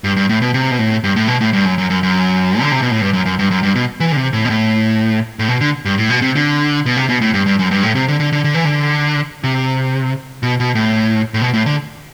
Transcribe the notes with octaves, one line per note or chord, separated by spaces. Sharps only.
G2
G2
A2
B2
C3
B2
A2
G2
A2
B2
A2
G2
F#2
F#2
F#2
F#2
D3
C3
B2
A2
G2
F#2
F#2
G2
F#2
G2
B2
E3
D3
C3
A2
B2
A2
A2
B2
D3
G2
A2
B2
C3
D3
B2
C3
B2
A2
G2
G2
F#2
G2
A2
C3
D3
D3
D3
D3
E3
D3
C3
B2
B2
A2
A2
B2
A2
D3